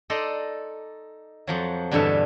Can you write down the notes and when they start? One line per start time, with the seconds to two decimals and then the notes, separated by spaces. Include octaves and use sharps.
0.10 D#4 A4 D5 D#5 A#5 C6
1.47 F2 F3 F#3
1.91 E2 G2 B2 D3 A4 E5